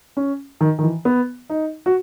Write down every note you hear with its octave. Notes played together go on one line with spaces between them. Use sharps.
C#4
D#3
D#3
E3
B3
D#4
F#4